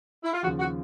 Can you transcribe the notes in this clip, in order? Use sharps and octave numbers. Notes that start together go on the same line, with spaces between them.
E4
F4
D#2 C#3 F3 F#4
F#4